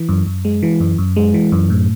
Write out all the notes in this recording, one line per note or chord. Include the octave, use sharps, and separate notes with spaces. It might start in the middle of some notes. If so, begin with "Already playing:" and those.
Already playing: E3
F#2
F#2
G#3
E3
F#2
F#2
G#3
E3
F#2
A2